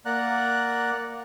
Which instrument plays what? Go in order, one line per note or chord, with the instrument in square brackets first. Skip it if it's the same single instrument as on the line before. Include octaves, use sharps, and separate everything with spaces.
[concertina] A#3 D5 F#5 A#5 F#6